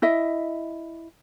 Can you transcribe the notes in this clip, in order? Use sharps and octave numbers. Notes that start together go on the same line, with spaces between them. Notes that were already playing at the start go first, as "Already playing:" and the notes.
E4 D#5 E5